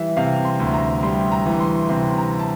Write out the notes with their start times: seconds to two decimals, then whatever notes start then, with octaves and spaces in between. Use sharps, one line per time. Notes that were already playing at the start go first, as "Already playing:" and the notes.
Already playing: E3 G3 E5
0.17 C3 F5
0.45 C6
0.60 D2
0.74 A#5
1.03 G3 C6
1.32 A#5
1.46 E3
1.60 C6
1.89 C3 C6
2.18 A#5
2.39 A5